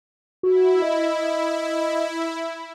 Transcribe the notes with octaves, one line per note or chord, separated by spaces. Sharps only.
E4 F#4
D#5